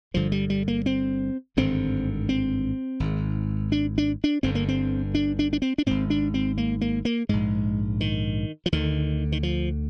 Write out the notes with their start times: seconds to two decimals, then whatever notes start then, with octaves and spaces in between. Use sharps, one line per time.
0.14 G1 G2 D3 F3
0.32 G3
0.50 G3
0.68 A#3
0.86 C4
1.57 G#1 G2 D3 C4
2.29 C4
3.00 G#1 G#2
3.72 D4
3.98 D4
4.24 D4
4.43 G1 G2 D3 C4
4.55 A#3
4.69 C4
5.15 D4
5.39 D4
5.53 D4
5.62 C4
5.78 D4
5.86 G#1 G#2 C4
6.10 D4
6.34 C4
6.58 A#3
6.81 A#3
7.05 A#3
7.29 A#1 G#2 G#3
8.01 D#3
8.66 F3
8.72 D2 D3 D#3
9.32 D#3
9.43 F3